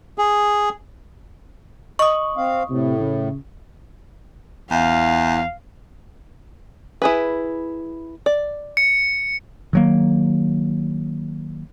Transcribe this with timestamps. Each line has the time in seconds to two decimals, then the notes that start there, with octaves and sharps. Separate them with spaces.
0.18 G#4
1.99 D#5 C#6 D#6
2.37 C4 F5
2.70 A2 C3
3.00 C#3
4.71 E2 F5
7.02 E4 G#4 B4
8.26 D5
8.77 C#7
9.73 D#3 F#3 A#3